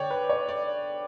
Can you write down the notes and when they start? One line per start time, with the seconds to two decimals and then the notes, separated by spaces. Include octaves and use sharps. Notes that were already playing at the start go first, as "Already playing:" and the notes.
Already playing: D3 C#5 D5 G5
0.10 B4
0.29 C#5
0.49 D5